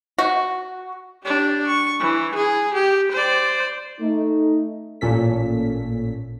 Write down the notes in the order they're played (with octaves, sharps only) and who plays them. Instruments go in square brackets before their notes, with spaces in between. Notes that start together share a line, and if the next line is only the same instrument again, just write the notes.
[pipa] F#4
[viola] D4 G4
C#6
E3
G#4
G4
C5 D5
[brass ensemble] A3 D#4
[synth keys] A1 A#2 C#4 A4 B6